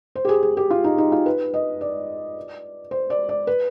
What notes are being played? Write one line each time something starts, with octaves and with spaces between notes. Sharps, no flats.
C5
G4
G#4
G#4
G4
F4
D#4
D#4
F4
B4
D#5
D5
C5
D5
D5
B4